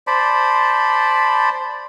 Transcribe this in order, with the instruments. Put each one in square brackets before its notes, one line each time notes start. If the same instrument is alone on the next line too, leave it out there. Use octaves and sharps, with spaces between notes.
[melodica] C5 D5 A5 B5